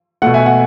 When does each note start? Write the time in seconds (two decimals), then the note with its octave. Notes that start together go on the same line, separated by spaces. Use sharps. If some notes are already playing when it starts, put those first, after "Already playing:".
0.22 B2 A3 F#5
0.34 E5 G#5
0.46 F#5